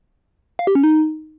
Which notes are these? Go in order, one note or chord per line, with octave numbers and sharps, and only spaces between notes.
F5
G4
C#4
D#4